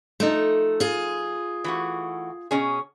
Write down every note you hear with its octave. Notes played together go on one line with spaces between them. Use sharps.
F3 A3 D#4
F4 G#4
E3 A3 F#4
B2 C#4 G#4